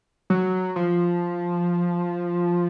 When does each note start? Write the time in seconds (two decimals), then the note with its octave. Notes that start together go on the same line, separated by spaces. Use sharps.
0.30 F#3
0.76 F3